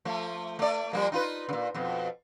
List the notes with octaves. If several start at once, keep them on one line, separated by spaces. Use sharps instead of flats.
F3 A3
A3 D5
F3 G3 A#3
D#4 F4 B4
A#2 C#3
F2 B2